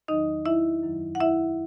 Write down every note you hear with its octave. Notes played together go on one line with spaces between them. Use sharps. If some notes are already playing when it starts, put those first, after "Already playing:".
E2 D#3 F#3 D#4 D#5
E4 E5
F#2 D#3 F#3
F#5
E4 E5